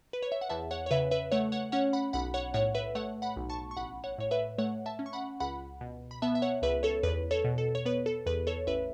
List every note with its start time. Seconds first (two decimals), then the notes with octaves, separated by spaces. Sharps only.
0.13 B4
0.22 C#5
0.32 E5
0.41 F#5
0.49 E2 E5 A5
0.71 C#5 F#5
0.86 C#5
0.91 C#3 B4 E5
1.11 B4 E5
1.32 A3 C#5 F#5
1.52 C#5 F#5
1.72 C#4 C#5 F#5
1.93 F#5 B5
2.13 B1 F#5 B5
2.34 C#5 F#5
2.54 A2 C#5 F#5
2.75 B4 E5
2.95 A3 C#5 F#5
3.22 F#5 B5
3.36 B1
3.49 A5 C#6
3.71 C#6
3.77 A1 F#5 B5
4.04 C#5 F#5
4.18 A2 C#5
4.31 B4 E5
4.58 A3 C#5 F#5
4.86 E5 A5
4.99 C#4
5.06 C#6
5.13 F#5 B5
5.40 C#2 F#5 B5
5.81 B2
6.11 B5
6.22 B3 E5 A5
6.35 E5
6.42 C#5 F#5
6.62 C#2 B4 E5
6.83 A4 C#5
7.03 E2 B4
7.31 A4 C#5
7.44 B2
7.58 A4
7.75 C#5
7.85 B3 B4
8.06 A4
8.26 E2 B4
8.47 A4 C#5
8.67 A1 B4 E5